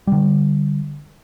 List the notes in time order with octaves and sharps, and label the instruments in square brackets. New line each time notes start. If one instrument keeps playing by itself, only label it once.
[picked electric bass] D3 G3